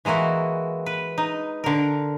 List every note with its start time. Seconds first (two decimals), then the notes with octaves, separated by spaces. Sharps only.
0.05 E3 G#3 A#3 E4 F#4
0.86 B4
1.18 D#4
1.64 D3 A#4